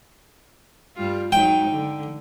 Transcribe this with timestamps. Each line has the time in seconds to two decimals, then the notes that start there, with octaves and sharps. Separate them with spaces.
0.96 G2 G3 F4
1.32 F#3 G#3 D#4 G5
1.71 D3